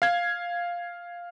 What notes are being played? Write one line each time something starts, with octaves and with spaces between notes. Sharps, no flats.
F5 G#6